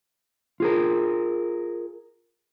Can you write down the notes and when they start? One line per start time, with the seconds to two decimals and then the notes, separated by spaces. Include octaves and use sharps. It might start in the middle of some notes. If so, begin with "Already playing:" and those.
0.60 F4 G#4 A#4